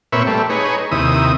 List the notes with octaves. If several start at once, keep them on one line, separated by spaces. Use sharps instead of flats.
A#2 C4 B4 C#5 E5
G3 A3
D#4 G#4 B4 C#5
D#2 C3 E4 D#6